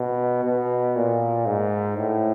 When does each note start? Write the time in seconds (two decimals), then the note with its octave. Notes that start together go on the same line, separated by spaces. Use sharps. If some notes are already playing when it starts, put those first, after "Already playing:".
Already playing: B2
0.45 B2
0.96 A#2
1.46 G#2
1.97 A2